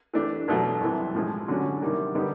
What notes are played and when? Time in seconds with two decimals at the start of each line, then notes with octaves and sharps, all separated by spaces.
0.14 E3 A3 D4 G4
0.48 E2 B2 F#3 A3
0.81 C2 C3 E3
1.15 A2 F3 G#3
1.48 D3 F#3 A3 C#4 F#4
1.81 C3 D#3 G3 A#3
2.15 D3 G3 B3 D#4 G4